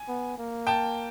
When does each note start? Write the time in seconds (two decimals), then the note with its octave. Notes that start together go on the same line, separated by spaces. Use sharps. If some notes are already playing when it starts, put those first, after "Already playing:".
Already playing: G#5
0.08 B3
0.38 A#3
0.67 G5 A5